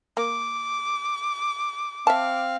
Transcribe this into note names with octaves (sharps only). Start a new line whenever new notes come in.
A#3 D6
C4 E5 F5 A5